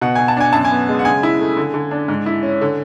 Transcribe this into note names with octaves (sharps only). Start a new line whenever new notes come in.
B2 F#5
B2 G#5
A5
D4 G#5
F#2 A5
G#5
B3
G#3
F#5
C#3 G#5
E4
A3
D3
D3
D4
G#2
E4
C#4
D3